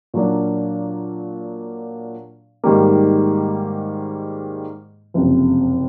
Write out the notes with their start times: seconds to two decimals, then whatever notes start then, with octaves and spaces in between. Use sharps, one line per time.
0.14 A#2 F#3 A#3 D4
2.64 G#2 D#3 G3 A#3
5.14 F#1 F2 C3